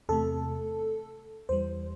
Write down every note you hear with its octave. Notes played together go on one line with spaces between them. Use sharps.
E2 C3 A3 A4
E2 E3 G3 C5